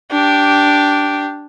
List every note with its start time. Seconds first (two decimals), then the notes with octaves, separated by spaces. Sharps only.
0.12 D4 G4